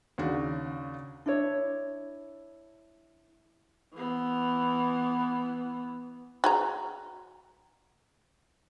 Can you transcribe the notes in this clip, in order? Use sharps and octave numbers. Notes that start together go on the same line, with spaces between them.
D#2 C#3 D4 F#4
D4 E4 C#5
E3 B3
F#4 G#4 A#5